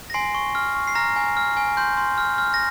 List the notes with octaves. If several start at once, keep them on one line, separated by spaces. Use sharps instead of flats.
A#6
G#5 C6 C7
C#6
F6
C#6
C7
A#5 F6 A#6
G#5
F6
G#5
C6 G6
C6
F6
F6
A#6